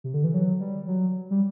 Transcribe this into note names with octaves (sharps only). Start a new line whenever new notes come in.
C3
D3
E3
F#3
G3
F#3
G3